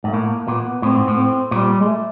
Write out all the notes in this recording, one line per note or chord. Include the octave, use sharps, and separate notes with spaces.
G#2 A3
A2 A#3
A#2 B3
A2 C4
G#2
A2
C4
A#2 G3
G#3
A3